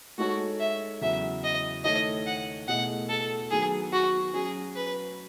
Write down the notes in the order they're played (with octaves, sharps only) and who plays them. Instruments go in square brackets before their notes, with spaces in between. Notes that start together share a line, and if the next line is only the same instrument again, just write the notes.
[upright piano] G#3 D#4 A4 C#5 [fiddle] F#4
[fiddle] E5
[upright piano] E2 C#3 F#3 [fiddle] E5
[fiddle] D#5
[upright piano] D#3 A3 E4 A4 C#5 [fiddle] D#5
[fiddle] F#5
[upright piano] B2 A3 E4 G#4 D#5 [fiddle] F#5
[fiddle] A4
[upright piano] D#3 F#3 B3 [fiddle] G#4
[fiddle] F#4
[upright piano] F#3 C#4 F#4 [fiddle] G#4
[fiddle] B4